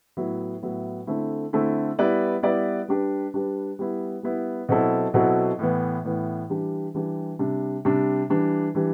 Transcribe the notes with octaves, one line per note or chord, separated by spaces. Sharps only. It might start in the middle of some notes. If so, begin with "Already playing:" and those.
A2 F#3 B3 E4
A2 F#3 B3 E4
D3 A3 C4 E4 A4
D3 A3 C4 E4 A4
G3 B3 E4 B4 D5
G3 B3 E4 B4 D5
G3 D4 G4 B4
G3 D4 G4 B4
G3 B3 E4
G3 B3 E4
B2 F#3 C4 E4 A4
B2 F#3 C4 E4 A4
A2 E3 B3
A2 E3 B3
E3 G3 D4 G4
E3 G3 D4 G4
C3 G3 D4
C3 G3 D4
E3 G3 D4
E3 G3 D4